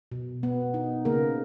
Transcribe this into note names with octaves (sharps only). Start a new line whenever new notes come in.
B2
B3
D#4
C#3 A#3 A#4